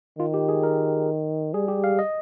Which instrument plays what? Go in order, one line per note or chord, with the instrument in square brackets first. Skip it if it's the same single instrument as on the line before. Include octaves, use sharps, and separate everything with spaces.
[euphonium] D#3 [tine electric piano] F4
[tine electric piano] G4
G#4
A#4
[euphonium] G3 [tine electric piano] G#4
[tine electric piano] G4
F5
D#5